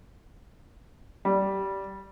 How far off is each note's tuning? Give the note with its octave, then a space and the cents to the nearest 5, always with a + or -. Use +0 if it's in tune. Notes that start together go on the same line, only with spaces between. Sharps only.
G3 -10